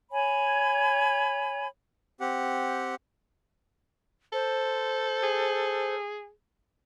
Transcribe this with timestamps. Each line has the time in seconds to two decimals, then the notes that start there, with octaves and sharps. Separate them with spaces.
0.10 C#5 G#5 B5
2.20 C4 G4 F#5
4.33 A4 C5
5.23 G#4